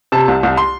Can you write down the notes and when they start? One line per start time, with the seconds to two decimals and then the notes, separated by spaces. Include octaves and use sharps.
0.12 C3 A5
0.28 C2
0.43 C2
0.57 C6